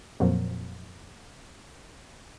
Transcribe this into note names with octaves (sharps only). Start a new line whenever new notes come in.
F2 A#2 F3 F#3